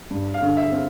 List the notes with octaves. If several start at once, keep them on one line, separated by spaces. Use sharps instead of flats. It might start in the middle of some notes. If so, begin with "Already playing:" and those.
G2
F5
D3
E5
C4